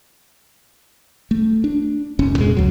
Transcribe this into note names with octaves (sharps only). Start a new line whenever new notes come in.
A3
D4
F1 C#4
F2 A#2 G#3
C#2 F#3